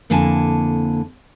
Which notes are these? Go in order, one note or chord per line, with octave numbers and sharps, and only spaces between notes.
F2 D3 A#3 E4 G#5 A5